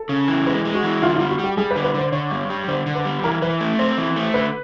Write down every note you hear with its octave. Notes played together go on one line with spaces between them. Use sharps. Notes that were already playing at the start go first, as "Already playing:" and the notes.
Already playing: A4
C#3
E3
G#3 B4
G#3
F#4
E3
D3 F4
G3 F4
F#4
G3 G4
G3 G#4
B4
D3
B4
D3 C5
D3 C#5
G2
G3
D3 C5
D3
B4
G3
E3 A#4
E3 B4
A3
C4 C5
E3
A3
D3 B4